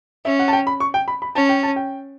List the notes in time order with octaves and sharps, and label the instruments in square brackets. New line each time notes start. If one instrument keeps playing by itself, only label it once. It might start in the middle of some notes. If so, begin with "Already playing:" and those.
[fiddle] C#4 [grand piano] E5
[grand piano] F#5
A5
G5
B5
C#6
G5
B5
B5
[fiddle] C#4 [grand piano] A5
[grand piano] G5
A5
G5